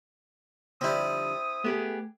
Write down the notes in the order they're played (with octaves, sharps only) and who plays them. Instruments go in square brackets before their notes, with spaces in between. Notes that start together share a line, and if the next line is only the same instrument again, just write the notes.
[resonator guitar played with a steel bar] D3 F3 G3 [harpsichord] C4 E4 [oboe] D#6
[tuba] A3 [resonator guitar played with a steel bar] B3 G4 G#4